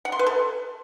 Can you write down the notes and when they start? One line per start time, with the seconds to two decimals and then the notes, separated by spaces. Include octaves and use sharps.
0.05 F#5
0.12 C6
0.19 B4
0.26 A4